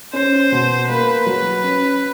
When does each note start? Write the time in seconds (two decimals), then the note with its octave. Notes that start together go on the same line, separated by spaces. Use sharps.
0.13 C#4 C5
0.52 B2
0.89 A#3 B4
1.26 F#3
1.63 C#4